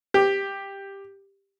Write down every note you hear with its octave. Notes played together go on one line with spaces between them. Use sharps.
G4